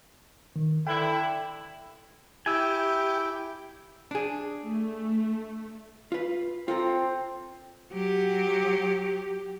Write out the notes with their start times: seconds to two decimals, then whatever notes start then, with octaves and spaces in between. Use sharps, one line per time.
0.56 D#3
0.87 D3 E4 G5
2.46 E4 G4 G#5 E6
4.11 D4 G#4
4.66 A3
6.12 F4 B4
6.68 C4 F4 A4 A#5
7.93 F#3 G4